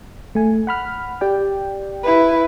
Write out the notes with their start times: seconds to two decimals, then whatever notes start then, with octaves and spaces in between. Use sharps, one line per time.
0.35 A3 G#5
0.67 F#5 B5 F6
1.21 G4 D5 G5
2.04 E4 B4